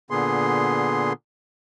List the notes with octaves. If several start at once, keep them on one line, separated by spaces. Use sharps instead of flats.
A#2 D3 B3 G#4 C6